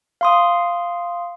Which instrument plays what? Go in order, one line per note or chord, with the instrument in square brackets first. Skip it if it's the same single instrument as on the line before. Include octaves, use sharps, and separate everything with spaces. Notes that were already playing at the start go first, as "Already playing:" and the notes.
[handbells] F5 C6 D#6